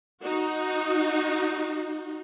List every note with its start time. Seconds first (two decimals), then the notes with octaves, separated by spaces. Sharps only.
0.23 D#4 F#4